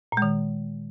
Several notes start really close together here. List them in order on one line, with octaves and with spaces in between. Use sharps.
A#2 G#3 D#3